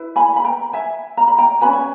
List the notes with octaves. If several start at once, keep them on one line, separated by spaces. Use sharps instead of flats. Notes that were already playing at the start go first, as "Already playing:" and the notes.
Already playing: E4 B4
G#5 B5
B5
G5 A#5
E5 G#5
A#5
B5
G5 A#5
C#4 G4 B4 G#5 B5
G#5